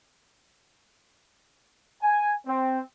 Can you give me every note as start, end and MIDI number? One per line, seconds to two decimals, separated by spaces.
2.02 2.31 80
2.46 2.79 60